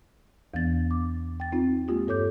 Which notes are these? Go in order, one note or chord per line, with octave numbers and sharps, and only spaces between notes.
E2 E3 B3 A6
D6
G5 A6
C4 D#4 F4
G#3 A#3 F4 G4
G2 A4 C#5 D6 G6